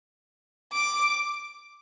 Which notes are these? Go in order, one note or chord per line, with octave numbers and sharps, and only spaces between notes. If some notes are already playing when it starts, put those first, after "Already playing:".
D6